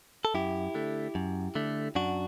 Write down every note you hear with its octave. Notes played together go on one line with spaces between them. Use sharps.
A4
F#2 E4 G4
D3 A3
F#2
D3 A3
F#2 D4 F#4